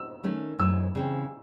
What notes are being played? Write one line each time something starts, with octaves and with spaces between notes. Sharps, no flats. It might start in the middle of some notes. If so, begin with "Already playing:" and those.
Already playing: E6
D#3 A3 C#4
F#2 E3 A3 E6
C#3 E3 C4